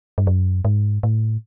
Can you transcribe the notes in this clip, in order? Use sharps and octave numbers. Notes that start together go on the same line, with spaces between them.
G2
F#2
G#2
A2